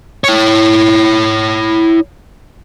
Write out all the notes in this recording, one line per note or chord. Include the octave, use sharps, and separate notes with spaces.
E4 C#5